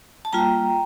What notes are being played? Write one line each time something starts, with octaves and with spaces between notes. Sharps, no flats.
A5
G3 A#3 F4 G5 A#5